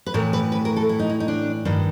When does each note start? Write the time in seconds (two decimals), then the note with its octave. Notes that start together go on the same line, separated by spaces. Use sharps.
0.06 B4
0.14 A2 E3 A#4
0.33 B4
0.52 B4
0.65 A#4
0.76 A4
0.89 E4
0.99 D#4
1.09 E4
1.20 D#4
1.28 D4
1.65 G2 D#3